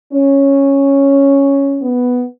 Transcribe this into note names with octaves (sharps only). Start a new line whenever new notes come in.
C#4
B3